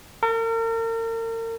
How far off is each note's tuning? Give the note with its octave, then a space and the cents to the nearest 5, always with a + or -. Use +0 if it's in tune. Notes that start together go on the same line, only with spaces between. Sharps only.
A#4 -40